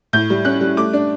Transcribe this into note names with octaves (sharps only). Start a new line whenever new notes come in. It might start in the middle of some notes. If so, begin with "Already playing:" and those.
A2 G6
G3
C#4 F#6
G3
A3 D6
D4